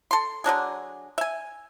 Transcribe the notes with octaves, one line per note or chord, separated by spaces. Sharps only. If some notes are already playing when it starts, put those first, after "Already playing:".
A4 C6
D3 F#3 D4 G#4
E5 G#5